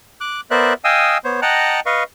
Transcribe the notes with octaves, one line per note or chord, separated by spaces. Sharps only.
D6 F#6
B3 A#4 C5 D5 E5 F#6
D#5 F5 G5 G#5 D#6 E6
B3 C5 C#5
D#5 F#5 G5 A5 A#5 F#6
B4 D#5 F5 C#6